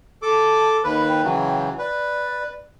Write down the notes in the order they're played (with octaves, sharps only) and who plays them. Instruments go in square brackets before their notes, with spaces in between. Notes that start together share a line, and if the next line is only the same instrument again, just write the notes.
[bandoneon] A4 D6 [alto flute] A5
[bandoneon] D#2 B4 [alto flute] B5
[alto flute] G5
[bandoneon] C#3 E3 F#3
[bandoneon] B4 [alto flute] D5